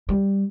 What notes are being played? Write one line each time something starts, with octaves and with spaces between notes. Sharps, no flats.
G3